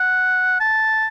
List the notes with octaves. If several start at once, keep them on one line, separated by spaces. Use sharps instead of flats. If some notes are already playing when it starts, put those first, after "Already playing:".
Already playing: F#5
A5